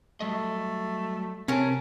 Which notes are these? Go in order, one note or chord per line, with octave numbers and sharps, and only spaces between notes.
F#3 G3 A3 D#5
C3 C4 C#4 A#4 A5